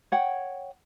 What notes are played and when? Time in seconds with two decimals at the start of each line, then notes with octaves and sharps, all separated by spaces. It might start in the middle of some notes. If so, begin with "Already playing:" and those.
0.12 C#5 F#5 G5